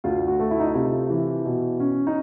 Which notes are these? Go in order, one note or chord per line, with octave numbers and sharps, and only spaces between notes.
D2 F4
F#4
A3
E4
D#4
E4
C3 F4
E3
B2
C#4
D#4